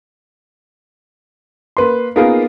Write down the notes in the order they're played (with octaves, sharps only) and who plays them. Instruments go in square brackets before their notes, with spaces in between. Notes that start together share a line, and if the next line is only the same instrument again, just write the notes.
[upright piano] A#3 B4 C6
A#3 B3 D#4 F4 G#4 A#4